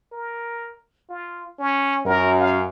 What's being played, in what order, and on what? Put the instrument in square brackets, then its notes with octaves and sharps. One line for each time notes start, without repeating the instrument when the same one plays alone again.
[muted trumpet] A#4
F4
C#4
[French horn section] F#2 [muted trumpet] A#4
[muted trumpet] F5